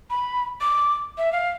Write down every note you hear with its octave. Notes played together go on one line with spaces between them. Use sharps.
B5
D6
E5
F5